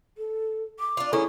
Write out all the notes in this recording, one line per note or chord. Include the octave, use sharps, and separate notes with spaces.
A4
D6
D4 F4
D#3 G#3 C#4 E4 A4 D5 C#6